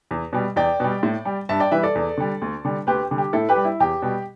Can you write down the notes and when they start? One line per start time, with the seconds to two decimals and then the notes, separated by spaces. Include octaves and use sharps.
0.11 E2
0.33 B2 G3
0.56 E2 D5 G5
0.80 B2 G3
1.03 A2
1.25 G3
1.49 G2 E5 A5
1.60 D5 G5
1.71 E3 G3 B4 E5
1.83 A4 D5
1.95 E2
2.17 D3 G3
2.42 D2
2.65 D3 G3
2.87 D2 G4 B4
3.11 D3 G3
3.18 G4
3.33 A2 E4 A4
3.49 G4 B4
3.56 G3
3.65 E4
3.80 E2 G4
4.02 B2 G3